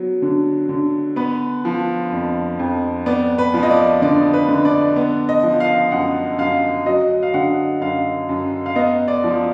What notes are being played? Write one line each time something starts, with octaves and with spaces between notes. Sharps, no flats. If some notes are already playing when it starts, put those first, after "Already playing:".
Already playing: F#3 B3
D3
D3
B3 B4
F3
F2
F2
B3 D5
B4
F3
D#5
D5
D3 D5
B4
D3
D5
B3
D#5
F3
F5
F#2 F#5
F#2 F5
F#3 D#5
F5
D3 F#5
F#2 F5
F#2
F5
B3 D#5
D5
F3